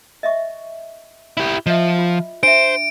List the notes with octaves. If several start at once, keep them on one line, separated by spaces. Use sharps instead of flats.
D#5 E5 C#6
E4 G4
F3 D#5 E5
F4
D4 C5 E5 D7